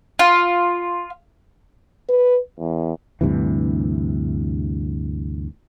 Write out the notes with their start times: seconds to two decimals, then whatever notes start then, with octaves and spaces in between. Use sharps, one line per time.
0.19 F4
2.09 B4
2.59 E2
3.21 D2 G2 C3 E3